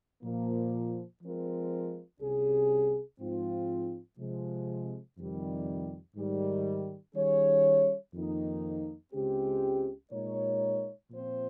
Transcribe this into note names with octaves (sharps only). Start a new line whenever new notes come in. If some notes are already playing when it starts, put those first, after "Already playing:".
A#2 F3 A#3
F3 G#3 C4 F4 A#4
C2 C3 G3 C#4 G#4
G#2 F3 C4 F4
C3 F3 G#3
F2 C3 D#3 G3
G#2 D#3 G3
D#3 G3 C#4 G#4 C#5
F2 D#3 A#3 D#4
C#2 C#3 G#3 C4 G4
A#2 G#3 D#4 A#4 C#5
A#2 F3 C4 F4 C5